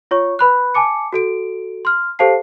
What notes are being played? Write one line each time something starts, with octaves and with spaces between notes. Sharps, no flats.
F4 C#5 C#6
B4 B5 F#6
G#5 A5 D6 C#7
F#4 A4 D7
C6 F6
G4 A4 C5 F5 A5 C7